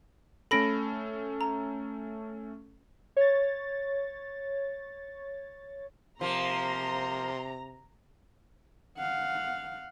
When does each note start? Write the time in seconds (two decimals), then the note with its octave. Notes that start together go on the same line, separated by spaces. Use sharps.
0.51 A3 C#4 A4 B5 A#6 D7
1.41 A#5
3.17 C#5 A6
6.21 C3 F3 A#3 A#5 C6
8.98 F5 F#5